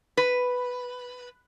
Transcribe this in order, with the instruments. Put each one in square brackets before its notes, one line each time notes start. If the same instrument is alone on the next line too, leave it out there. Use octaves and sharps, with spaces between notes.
[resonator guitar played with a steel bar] B4